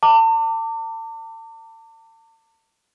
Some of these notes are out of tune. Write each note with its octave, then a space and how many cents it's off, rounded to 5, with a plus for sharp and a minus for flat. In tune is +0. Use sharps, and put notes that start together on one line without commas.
A5 +40 D6 +0